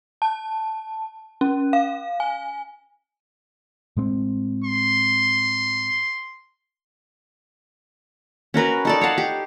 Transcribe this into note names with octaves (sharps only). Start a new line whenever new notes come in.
A5
C#4
F5
G#5
A2 G#3 C4
C6
C#4 F#4 A#4 B4
D#4 A4 D5
C#5 F5 F#5 A5
G4